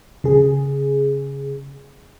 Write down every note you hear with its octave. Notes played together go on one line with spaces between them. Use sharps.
C#3 G#4